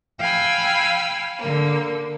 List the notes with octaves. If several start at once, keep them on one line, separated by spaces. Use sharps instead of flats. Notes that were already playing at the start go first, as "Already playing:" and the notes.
F5 G5 G#5 B5 E6
D3 A#3